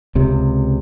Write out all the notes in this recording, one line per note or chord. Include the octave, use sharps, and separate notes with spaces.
C#2 C3